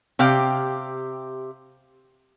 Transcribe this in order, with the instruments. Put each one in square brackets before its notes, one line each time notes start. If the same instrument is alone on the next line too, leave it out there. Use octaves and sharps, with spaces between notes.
[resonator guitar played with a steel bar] C3 G4 F5 G5